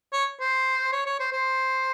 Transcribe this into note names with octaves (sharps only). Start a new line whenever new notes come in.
C#5
C5
C#5
C#5
C5
C5